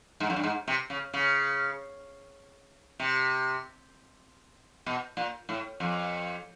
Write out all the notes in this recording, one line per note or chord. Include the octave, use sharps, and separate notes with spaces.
G#2
F#2
G2
G#2
C3
C#3
C#3
C3
B2
A#2
A2
F2